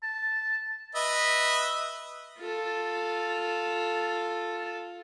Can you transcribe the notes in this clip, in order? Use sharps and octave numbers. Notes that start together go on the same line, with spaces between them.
A5
B4 D#5 E5
F4 A4